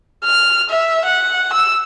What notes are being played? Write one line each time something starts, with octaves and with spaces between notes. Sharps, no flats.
F6
E5
F#5
E6